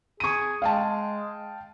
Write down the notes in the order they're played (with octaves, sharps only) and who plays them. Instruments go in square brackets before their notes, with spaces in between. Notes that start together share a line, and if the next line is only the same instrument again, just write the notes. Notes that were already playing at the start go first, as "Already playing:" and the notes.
[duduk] G#4 [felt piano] C#6 D#7
[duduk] G#3 [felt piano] F5 G5 A5